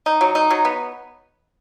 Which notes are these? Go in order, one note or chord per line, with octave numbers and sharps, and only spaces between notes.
D#4
F#3
D#4
F#3
B3